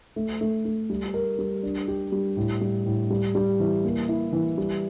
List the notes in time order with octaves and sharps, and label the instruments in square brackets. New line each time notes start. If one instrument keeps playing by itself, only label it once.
[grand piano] A3
A3
A3
G3
A#4
G3
D4
G4
G3
A2
G3
A2
G3
G3
E3
A#3
E4
E3
G3